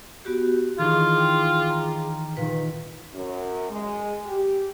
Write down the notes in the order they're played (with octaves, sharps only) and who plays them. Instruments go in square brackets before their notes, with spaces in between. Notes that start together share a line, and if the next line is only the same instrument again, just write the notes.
[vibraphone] B3 F#4 G4
[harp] D#3 E3 [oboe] F4 [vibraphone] G#4 D6
[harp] G5
A#5
[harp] A#2 D#3 [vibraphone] B4
[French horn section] F#2
G#3
G4